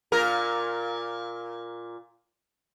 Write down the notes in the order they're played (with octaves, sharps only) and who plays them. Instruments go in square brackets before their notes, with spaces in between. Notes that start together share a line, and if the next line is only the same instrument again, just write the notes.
[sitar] A#2 A#4